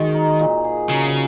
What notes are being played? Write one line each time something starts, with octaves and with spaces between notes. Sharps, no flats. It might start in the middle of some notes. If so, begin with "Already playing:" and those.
Already playing: D#3 G#3 F#4
D#4
A#2
G#4
C#3 F#3